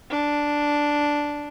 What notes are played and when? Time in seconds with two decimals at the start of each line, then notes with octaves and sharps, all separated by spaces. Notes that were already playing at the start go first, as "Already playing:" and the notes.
0.11 D4